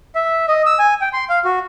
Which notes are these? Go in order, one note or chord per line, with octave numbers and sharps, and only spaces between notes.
E5
D#5
E6
G#5
G5
C6
F5
F#4